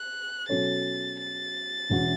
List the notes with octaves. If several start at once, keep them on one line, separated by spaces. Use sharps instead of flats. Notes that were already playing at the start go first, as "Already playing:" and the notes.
Already playing: F#6
B2 F#3 C#4 A4 C#5 A6
A6
E1 E2 E3 C#4 F#4